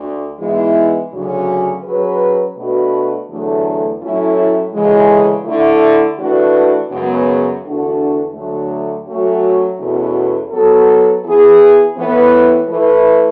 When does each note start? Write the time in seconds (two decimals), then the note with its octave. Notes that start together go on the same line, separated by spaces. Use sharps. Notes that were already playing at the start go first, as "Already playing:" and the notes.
Already playing: D2 D3
0.39 G#2 E3 G#3 B3 E4
1.11 D2 C#3 F#3 C#4
1.83 F#3 C#4 G#4 B4
2.56 B2 A3 D4 F#4 B4
3.28 E2 D3 F#3 A3
4.01 A2 F#3 A3 C#4 E4
4.73 D2 C#3 E3 G#3
5.45 D3 A3 E4
6.17 E3 A3 D4 F#4 B4
6.90 F#2 C#3 G#3 B3
7.63 E2 D3 A3 D4 F#4
8.34 D2 D3 F#3 A3
9.06 F#3 A3 C#4 F#4
9.78 E2 B2 A3 C#4 F#4
10.51 F#3 B3 F#4 A4
11.24 E3 B3 E4 G#4
11.97 A2 E3 B3
12.68 E3 A3 E4 B4